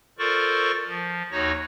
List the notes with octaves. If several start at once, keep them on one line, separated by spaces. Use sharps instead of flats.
F4 A4 A#4 C5 D5 C#6
F3
D#2 D#4 F#4 C#5 A#6